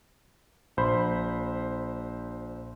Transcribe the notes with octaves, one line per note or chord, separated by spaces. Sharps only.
A#1 C5 B5